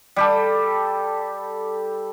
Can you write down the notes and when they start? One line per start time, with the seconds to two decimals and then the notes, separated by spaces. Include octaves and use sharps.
0.16 G3 G4 A4